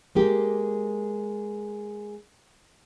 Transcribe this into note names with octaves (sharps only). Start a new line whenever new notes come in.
G#3 A#3 G4